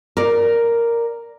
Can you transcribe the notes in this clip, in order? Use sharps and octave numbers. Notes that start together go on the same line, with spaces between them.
A#4 D5